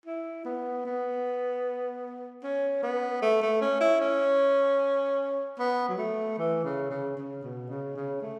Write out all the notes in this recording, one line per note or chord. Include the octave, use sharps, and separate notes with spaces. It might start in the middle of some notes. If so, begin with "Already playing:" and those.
E4
B3
B3
C#4
B3
A3
A3
C#4
E4
C#4
B3
F#3
A3
E3
C#3
C#3
C#3
B2
C#3
C#3
A3